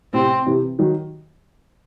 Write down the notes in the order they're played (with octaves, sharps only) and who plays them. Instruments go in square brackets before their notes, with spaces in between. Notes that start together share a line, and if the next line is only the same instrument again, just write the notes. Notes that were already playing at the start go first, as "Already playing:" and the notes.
[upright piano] A2 C3 [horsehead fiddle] C4
[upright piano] C3 E3
D#3 F#3